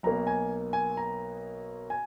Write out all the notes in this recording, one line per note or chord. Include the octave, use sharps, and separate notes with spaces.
B1 B2 A#3 A#5
G#5
G#5
A#5
G#5